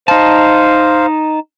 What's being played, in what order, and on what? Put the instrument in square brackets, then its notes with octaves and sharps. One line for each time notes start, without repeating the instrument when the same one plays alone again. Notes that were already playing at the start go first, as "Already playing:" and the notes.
[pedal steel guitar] D#4 A5 [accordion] C5 F5